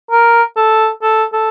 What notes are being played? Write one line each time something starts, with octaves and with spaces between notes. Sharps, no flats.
A#4
A4
A4
A4